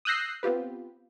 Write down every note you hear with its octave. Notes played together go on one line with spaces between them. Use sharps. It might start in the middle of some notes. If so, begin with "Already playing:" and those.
D#6 E6 F#6 G6 A#6 C7
B3 C4 F4 G4 B4